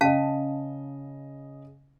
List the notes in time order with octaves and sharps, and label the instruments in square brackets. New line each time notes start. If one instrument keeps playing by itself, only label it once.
[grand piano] C#3 D#5 [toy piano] C#4 F5 A5